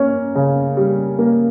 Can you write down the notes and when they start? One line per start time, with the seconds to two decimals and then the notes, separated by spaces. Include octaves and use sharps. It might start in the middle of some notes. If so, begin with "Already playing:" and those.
Already playing: A#3 C#4
0.35 C#3
0.77 G3
1.19 A#3